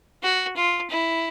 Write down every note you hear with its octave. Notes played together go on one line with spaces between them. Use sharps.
F#4
F4
E4